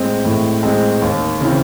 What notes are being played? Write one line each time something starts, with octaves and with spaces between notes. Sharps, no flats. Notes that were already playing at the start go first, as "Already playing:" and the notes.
Already playing: A2 G#3 C4
A2
G#3 C4
D#2
C#3 E3 C4